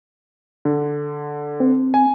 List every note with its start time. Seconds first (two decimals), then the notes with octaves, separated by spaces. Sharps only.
0.65 D3
1.60 C4
1.94 G#5